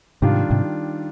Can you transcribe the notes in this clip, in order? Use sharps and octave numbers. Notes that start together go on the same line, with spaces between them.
G#2 C3 D#3 G3 D4 F4
G#2 C3